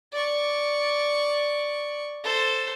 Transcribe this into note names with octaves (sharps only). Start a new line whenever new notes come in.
D5 C#6
A4 C5